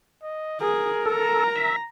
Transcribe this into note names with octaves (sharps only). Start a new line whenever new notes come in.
D#5
G#4 A#4
A4 A#5
E5